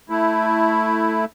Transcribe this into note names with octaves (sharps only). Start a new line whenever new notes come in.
A3 E4